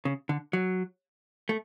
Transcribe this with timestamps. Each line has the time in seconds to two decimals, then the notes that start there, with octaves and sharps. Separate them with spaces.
0.05 C#3
0.29 D3
0.53 F#3
1.49 A3